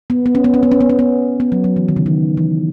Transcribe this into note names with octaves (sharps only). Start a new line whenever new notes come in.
B3
B3
C#4
B3
C#4
B3
C#4
B3
C#4
B3
B3
F#3
F#3
E3
D#3
C#3
D#3
E3